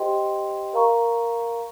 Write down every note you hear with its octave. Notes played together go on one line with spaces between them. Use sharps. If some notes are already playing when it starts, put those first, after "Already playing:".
Already playing: G4 C5 D#5 G5 C6
A#4 F5 A#5 C#6